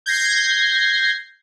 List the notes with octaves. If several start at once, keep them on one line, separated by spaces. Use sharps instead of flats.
G6 G#6 A#6 C7